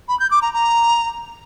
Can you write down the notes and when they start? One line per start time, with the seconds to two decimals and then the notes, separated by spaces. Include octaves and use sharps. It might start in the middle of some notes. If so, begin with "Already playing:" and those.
0.08 B5
0.20 G6
0.31 D6
0.42 A#5
0.53 A#5